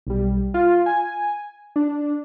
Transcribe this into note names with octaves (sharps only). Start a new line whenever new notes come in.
B1 G3
F4
G#5
D4